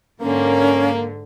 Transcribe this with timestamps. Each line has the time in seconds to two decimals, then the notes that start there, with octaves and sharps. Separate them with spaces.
0.21 G#2 D3 A#3 C#4